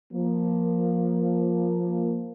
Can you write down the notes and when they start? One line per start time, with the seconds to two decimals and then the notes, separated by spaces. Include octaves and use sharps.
0.13 F3 A#3